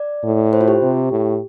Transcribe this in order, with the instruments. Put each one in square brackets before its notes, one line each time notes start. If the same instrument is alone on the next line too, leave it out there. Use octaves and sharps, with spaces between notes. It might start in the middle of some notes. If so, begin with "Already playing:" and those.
Already playing: [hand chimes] D5
[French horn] A2
[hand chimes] C5
F4
G4
[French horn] C3
A2